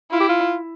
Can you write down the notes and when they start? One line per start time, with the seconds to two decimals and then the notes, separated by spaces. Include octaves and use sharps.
0.12 E4 F4
0.20 G4
0.29 F4